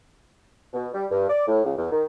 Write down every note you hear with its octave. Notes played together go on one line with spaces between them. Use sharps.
B2
G3
G2
D5
A2
C#2
E2
D#3